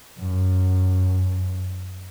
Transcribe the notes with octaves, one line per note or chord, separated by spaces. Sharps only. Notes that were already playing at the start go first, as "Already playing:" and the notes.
F#2